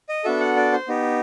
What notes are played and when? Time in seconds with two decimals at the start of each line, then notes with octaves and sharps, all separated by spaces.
0.09 D#5
0.24 B3 D4 F#4 A4 E5
0.40 F#5
0.56 D5
0.72 C5
0.88 B3 D#4 G4